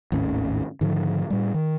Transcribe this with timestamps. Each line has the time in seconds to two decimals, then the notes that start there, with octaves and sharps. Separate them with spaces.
0.12 G#1 D#2 A2 C#4
0.81 G#2 D3 D#3 F3
1.30 A2 G3
1.54 D#3